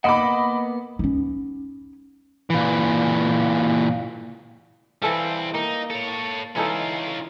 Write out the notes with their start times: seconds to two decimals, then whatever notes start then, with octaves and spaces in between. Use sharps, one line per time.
0.04 A#3 B3 D#5 F#5 B5 D6
0.99 C#4 D#4
2.50 A#2 E3
5.02 E3 G3 C4 A4 F5
5.54 A#3 D#4
5.90 A4 C#5
6.56 E3 C#4 D#4 F4 A4